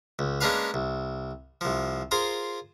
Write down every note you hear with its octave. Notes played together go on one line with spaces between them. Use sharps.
C#2
G#3 A#3 C#4 D4 B4 F5
C2
C2 F3
F4 G#4 A#4 C5